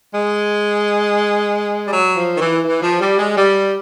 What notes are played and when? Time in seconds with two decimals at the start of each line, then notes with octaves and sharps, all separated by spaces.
0.15 G#3
1.87 G3
1.93 F#3
2.16 F3
2.36 D#3
2.40 E3
2.65 E3
2.82 F3
3.00 G3
3.19 G#3
3.36 G3